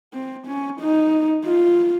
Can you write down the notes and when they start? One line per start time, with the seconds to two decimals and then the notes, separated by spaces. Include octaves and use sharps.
0.13 C4
0.47 C#4
0.80 D#4
1.46 F4